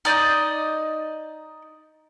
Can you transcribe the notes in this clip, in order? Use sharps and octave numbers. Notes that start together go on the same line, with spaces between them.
D#4 D5 D#5 G6